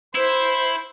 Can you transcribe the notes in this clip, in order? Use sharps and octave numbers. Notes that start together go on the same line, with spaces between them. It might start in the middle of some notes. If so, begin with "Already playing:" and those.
E4 C5